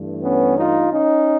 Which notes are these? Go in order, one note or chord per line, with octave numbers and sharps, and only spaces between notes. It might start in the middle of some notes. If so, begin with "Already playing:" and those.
Already playing: G2 E3 A3
B3 C#4
D#4 F4
C#4 D#4